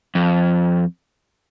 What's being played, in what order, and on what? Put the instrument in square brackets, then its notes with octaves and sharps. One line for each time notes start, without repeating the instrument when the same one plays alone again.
[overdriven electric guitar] F2